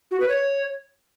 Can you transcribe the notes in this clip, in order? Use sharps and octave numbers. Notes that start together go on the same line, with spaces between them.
F#4
B4
C#5